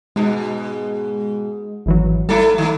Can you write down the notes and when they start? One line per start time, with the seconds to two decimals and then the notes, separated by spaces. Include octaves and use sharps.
0.16 G#2 B2 G#3
1.86 G#1 E3 F#3
2.29 G3 A3 E4 A4
2.58 D#3 A3